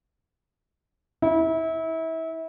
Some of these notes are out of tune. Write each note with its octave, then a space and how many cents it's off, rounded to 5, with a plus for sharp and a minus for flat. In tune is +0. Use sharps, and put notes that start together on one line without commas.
E4 -30